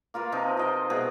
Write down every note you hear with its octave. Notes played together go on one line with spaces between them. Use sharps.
A#3 F4 A#4 B4
C3 F3 D#4
F4 D#5 G5
B2 G#4 E5 F#5